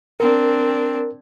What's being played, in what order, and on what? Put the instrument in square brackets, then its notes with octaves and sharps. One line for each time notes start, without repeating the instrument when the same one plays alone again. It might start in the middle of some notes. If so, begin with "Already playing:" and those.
[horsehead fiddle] C4 D4 [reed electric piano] A#4